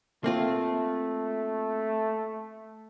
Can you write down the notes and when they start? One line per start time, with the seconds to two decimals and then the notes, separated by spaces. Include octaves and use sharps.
0.24 A3 A#3 C4 F4